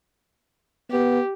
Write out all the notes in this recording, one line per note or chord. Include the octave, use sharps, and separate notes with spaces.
B3 G4